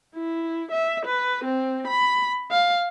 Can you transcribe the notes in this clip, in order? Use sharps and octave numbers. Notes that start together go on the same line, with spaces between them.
E4
E5
B4
C4
B5
F5